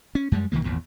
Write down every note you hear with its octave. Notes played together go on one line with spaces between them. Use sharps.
C#4
F#2 G3 G#3
B1 D#3 F3 A#3
G#1 E2 A#2